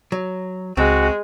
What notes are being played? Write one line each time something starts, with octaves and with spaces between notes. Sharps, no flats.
F#3
C#2 G#3 C4 F#4